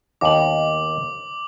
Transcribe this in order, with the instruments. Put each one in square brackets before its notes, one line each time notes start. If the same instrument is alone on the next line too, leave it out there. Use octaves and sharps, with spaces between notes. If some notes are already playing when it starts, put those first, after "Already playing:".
[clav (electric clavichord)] D#2 B3 D#4 [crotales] D6 F#7